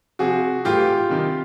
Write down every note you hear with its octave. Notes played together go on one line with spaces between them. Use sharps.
C3 F3 F#4 G#4
A2 E3 F4 G4
C3 D#3